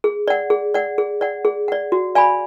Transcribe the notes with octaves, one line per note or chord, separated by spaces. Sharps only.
G#4
D5 F#5
G#4
D5 F#5
G#4
D5 F#5
G#4
D5 F#5
F#4
D5 F5 G#5 B5